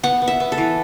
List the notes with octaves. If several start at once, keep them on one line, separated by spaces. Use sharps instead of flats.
B3 F#5
B3
E5
B3
A4
E3